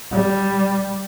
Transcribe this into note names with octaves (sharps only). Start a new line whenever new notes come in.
G3